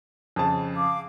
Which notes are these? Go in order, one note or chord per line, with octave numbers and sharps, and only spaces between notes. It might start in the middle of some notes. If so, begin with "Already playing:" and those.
F2 C#3 A5
F5 D6